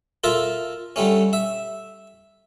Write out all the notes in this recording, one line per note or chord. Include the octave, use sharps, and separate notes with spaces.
F4 A4 A#4 E5
D3 G3 A3 C#4
E5